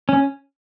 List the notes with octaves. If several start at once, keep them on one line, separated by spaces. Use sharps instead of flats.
C#4